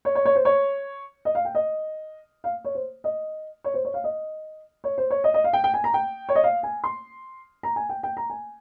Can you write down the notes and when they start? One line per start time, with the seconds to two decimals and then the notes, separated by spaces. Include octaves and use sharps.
0.05 C#5
0.15 C#5
0.25 C#5
0.35 C5
0.45 C#5
1.25 D#5
1.35 F5
1.45 G5
1.55 D#5
2.44 F5
2.65 C#5
2.75 C5
3.04 D#5
3.64 C#5
3.74 C5
3.85 C#5
3.94 F5
4.04 D#5
4.84 C#5
4.98 C5
5.10 C#5
5.24 D#5
5.34 D#5
5.44 F5
5.53 G5
5.64 G5
5.74 G#5
5.84 A#5
5.94 G5
6.29 C#5
6.35 D#5
6.44 F5
6.63 G#5
6.84 C6
7.63 A#5
7.76 G#5
7.89 G5
8.03 G5
8.17 A#5
8.30 G#5